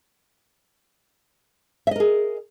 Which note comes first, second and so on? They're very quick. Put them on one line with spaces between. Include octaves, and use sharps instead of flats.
E5 D#5 A#4 G#4